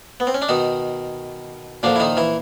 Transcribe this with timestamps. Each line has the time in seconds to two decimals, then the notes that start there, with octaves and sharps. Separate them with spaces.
0.20 B3
0.27 C4
0.34 C#4
0.42 D4
0.49 B2 D#3 D#4
1.83 A#2 D3 F3 D4
1.96 E4
2.00 D#3 D#4
2.17 E3 E4